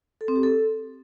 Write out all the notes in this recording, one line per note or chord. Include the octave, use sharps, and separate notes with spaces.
A4
C4
G4
A4